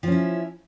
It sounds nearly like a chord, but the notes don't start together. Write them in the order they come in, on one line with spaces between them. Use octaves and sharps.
F3 C#4 E4